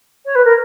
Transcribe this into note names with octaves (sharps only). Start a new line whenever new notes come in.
C#5
B4
A#4